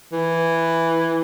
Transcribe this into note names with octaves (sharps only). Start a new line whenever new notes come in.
E3